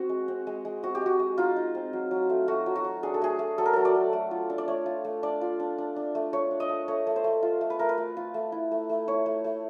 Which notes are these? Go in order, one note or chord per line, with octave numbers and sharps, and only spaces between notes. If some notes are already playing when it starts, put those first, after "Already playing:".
Already playing: C4 F#4
G#3
C4
G#3
G#3
C4 F#4
G4
G#3 F#4
G#3
D#4 F4
D#4
C4
F#3
F#3
A3
A3 F#4
F#3
F#4
F#3
D4 G#4
A4
A3 G#4
A3
F#3 A4
A#4
F#3 A4
D5
F#3
A3
F4
D4
D5
A3 C#5
F4
A3
D4 D5
F4
D4
D4
D4
A3
A3 C#5
D4
D#5
A3
A3 C#5
A3
C5
A3
F4
A3
B4
A3 A#4
B4
A3
F4
A3
E4
A3
A3
E4 C#5
A3
A3